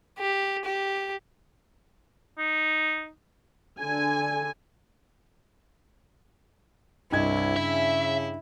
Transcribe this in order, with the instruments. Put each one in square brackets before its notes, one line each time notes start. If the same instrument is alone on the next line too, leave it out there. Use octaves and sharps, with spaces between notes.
[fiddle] G4
G4
[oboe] D#4
[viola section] D3 G#5
[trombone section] C2 [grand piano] G2 D#5 G#6 [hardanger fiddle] E4
[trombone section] C#3 [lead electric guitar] E5